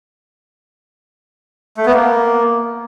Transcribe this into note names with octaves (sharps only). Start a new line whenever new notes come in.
A3
B3
A#3